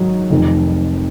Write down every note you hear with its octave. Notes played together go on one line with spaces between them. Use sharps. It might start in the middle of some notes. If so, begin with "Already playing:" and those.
Already playing: G#2 D#3 F#3 D#4
F1 F2 D#3